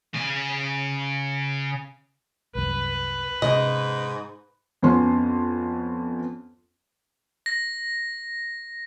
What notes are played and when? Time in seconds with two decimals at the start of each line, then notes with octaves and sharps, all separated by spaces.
0.14 C#3 G#5
2.55 C2 F#2 B4
3.42 G#2 C3 C#4 D#5
4.83 F2 B3 C#4 C6
7.46 A#6